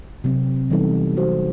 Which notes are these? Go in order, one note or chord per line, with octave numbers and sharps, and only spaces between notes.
C3 F#3 C4
E3 G3 B3 D#4 A4
F#3 C4 F#4 C5